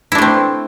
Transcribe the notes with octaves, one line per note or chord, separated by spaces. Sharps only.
A3 C4 D4 E4